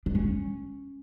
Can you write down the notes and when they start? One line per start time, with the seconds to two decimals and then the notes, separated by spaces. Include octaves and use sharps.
0.06 D4
0.15 C#4